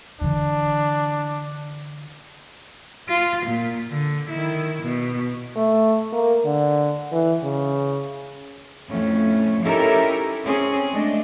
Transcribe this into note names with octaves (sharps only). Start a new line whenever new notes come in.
D3 E3 D4
F4
A#2
D3
D#3 E4
B2
A3
A#3
D3
E3
C#3
F2 A2 A3 C#4
C#4 D#4 E4 G4 A4 A#4
C4 C#4 G#4
G#3 A3 D4 D#5